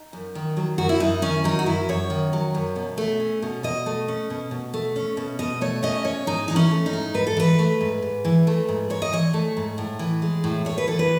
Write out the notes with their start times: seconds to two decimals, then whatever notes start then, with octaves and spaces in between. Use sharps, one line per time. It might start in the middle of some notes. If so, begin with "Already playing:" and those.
Already playing: D#4
0.13 F#2
0.35 D#3
0.57 F#3
0.78 F#2 F#4
0.89 E4
1.00 F#2 D#4
1.22 D#3 C#4
1.44 F#3 D#4
1.59 F#4
1.66 F#2 E4
1.89 F#2 C#5
2.10 D#3
2.33 F#3
2.55 F#2
2.76 B2
2.98 A3
3.20 C#4
3.42 B2
3.63 B2 D#5
3.86 A3
4.08 C#4
4.30 B2
4.51 B2
4.74 A3
4.96 C#4
5.17 B2
5.39 B2 D#5
5.61 A3 C#5
5.83 C#4 D#5
6.05 B2 C#5
6.27 G#2 D#4
6.48 E3 D#4
6.56 C#4
6.71 A3
6.86 D#4
6.93 G#2
7.14 G#2 B4
7.27 A4
7.37 E3 B4
7.59 A3
7.81 G#2
8.02 G#2
8.25 E3
8.47 A3
8.69 G#2
8.90 G#2 C#5
9.02 D#5
9.13 E3 C#5
9.34 A3
9.57 G#2
9.78 A2
9.99 E3
10.22 G#3
10.44 A2
10.65 A2 C#5
10.78 B4
10.87 E3 A4
10.99 B4